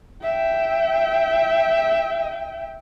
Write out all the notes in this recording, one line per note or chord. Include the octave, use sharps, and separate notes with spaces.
E5 G5